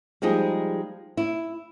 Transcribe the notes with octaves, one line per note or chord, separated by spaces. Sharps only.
F3 G3 G#3 D#4 G#4
E4